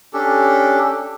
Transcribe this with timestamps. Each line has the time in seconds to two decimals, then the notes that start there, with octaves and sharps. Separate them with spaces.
0.13 C#4 D4 G4 A4